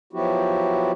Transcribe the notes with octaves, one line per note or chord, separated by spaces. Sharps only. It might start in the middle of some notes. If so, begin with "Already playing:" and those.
F3 F#3 B3 E4 F#4 G4